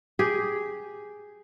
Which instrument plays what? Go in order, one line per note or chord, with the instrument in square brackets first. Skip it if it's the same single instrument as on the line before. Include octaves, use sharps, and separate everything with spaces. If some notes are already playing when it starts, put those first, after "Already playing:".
[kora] G4 G#4